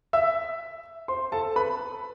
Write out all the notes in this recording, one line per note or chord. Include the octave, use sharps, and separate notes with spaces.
E5 E6
C5 C6
A4 A5
B4 B5